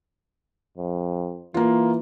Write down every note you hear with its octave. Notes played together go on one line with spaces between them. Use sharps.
F2
E3 A#3 F4